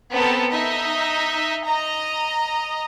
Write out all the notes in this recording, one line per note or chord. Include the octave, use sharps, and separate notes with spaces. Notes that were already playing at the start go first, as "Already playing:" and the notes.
B3 C4 A4 A#4 A5
D#4 D#5 E5
D#5 A#5